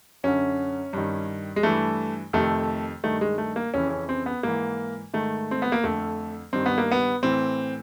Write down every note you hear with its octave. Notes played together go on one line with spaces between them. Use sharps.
F#2 D3 C#4
G2 D#3
G#3
G2 E3 A3
F2 C3 D#3 A3
G2 D#3 A3
G#3
A3
A#3
F2 C#3 E3 C#4
C#4
C4
B3
G#2 E3 A#3
G#2 D#3 A3
C4
B3
A#3
F2 D3 A3
G2 D#3 C4
B3
A#3
B3
A2 E3 C4